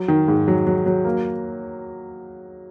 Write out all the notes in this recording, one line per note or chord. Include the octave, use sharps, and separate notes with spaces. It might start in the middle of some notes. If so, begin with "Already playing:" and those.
Already playing: F#3
D#3
G#2
F#3
F#3
F#3
A#3